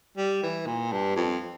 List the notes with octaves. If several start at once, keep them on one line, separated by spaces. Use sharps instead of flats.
G3
E3
A#2
G2
F2